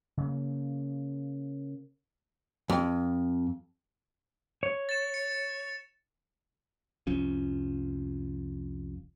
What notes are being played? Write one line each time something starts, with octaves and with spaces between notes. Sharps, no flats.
C#3 A#3
F2
C#5
A6 E7
C#7
F1 C2 F3 C#4